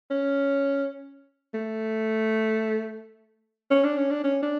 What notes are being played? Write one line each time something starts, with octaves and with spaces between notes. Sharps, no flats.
C#4
A3
C#4
D4
C#4
D4
C#4
D4